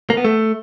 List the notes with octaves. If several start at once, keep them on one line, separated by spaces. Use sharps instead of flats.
A#3
B3
A3